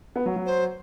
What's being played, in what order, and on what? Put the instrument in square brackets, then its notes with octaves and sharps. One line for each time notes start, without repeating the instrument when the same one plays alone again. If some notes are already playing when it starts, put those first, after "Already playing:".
[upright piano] B3
F#3
F#3
[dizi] C5